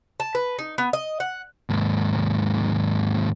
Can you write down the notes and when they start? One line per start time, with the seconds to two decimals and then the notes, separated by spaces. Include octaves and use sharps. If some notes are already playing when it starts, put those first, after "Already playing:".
0.20 A5
0.35 B4
0.59 D#4
0.78 B3
0.93 D#5
1.20 F#5
1.70 D#2 G#2